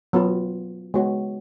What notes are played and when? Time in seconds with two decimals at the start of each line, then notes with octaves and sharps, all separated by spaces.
0.13 F#3 B3 F4
0.94 G#3 B3 F#4 C#5